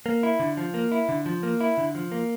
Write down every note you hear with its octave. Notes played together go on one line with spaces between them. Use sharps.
A#3
E4
D3
F3
A#3
E4
D3
F3
A#3
E4
D3
F3
A#3